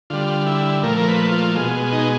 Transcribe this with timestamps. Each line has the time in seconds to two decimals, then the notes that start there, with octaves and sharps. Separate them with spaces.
0.10 D3 G3 F4
0.46 E4
0.83 A#2 F3 A3 A#4
0.98 A#4
1.08 B4
1.32 F4
1.55 B2 G#3 F4
1.92 D#4